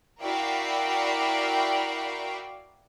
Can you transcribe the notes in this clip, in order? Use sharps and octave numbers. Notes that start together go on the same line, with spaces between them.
E4 F#4 A#4 D5 F5 G5